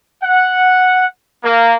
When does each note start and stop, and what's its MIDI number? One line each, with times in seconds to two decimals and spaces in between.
0.23 1.05 78
1.44 1.75 58